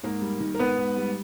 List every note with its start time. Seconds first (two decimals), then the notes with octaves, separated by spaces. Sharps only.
0.03 G#2 A#3 A#4
0.22 G3
0.40 D#3
0.55 A#4
0.59 G#2 B3 B4
0.78 G#2
0.97 G3